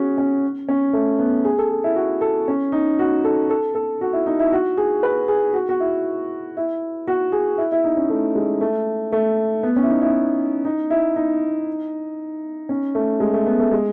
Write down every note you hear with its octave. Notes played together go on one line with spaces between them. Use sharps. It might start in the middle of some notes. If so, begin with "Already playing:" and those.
Already playing: C#4 F#4 G#4
C#4
C#4
A3
B3
G#4
A4
G#4
E4
F#4
A4
C#4
D#4
F#4
A4
A4
A4
F#4
E4
D#4
E4
F#4
G#4
B4
G#4
F#4
F#4
E4
E4
F#4
G#4
E4
E4
D#4
C#4
A3
G#3
A3
A3
B3
C#4
E4
D#4
E4
D#4
E4
D#4
C#4
A3
G#3
A3
B3
A3
G#3